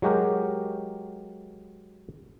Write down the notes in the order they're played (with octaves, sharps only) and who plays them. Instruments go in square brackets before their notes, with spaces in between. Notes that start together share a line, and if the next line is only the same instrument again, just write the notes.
[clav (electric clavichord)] F#3 G#3 F#4 G4 A#4